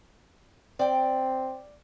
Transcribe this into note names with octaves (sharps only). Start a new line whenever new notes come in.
C4 D5 G5